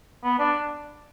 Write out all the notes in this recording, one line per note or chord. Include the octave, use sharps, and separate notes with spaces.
B3
D4